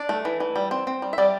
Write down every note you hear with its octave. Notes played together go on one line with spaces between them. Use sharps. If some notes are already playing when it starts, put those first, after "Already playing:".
Already playing: D4 D5
A3
E3
E3
G3
C4
C4
G3
E5
G3 D5